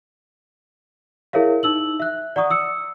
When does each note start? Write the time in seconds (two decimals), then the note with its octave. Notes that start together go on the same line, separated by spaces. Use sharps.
1.33 E4 G#4 A#4 C#5 E5 F5
1.63 D#4 E6 F#7
2.00 E5 F#6
2.36 D5 F#5 A#5 C#6 D#6
2.50 D#6 E6 C#7